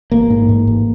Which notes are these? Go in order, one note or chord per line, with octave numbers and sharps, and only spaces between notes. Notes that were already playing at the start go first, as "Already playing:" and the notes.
A1 A#3
G#2
G#2
A1